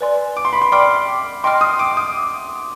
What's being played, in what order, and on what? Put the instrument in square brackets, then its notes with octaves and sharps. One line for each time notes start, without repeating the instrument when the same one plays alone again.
[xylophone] B4 D5 G#5 C6
[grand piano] D6
C6
B5
C6
[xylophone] D5 G5 C6 F6 [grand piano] D6
[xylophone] D#5 G5 D6 F6 [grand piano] C6
[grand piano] D#6
D6
D#6